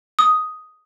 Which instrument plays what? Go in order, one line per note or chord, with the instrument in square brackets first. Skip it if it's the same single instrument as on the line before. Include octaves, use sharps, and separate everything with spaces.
[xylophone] D#6